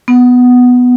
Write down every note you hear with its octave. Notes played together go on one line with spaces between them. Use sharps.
B3